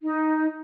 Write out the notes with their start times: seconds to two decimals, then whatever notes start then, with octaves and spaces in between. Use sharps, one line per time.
0.02 D#4